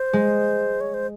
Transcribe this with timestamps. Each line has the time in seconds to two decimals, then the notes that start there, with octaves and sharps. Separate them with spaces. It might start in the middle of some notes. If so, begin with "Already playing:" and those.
Already playing: C5
0.13 G#3
0.81 C#5
0.94 C5